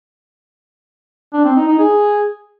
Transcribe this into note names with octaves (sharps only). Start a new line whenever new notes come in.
D4
C4
D#4
D#4
G#4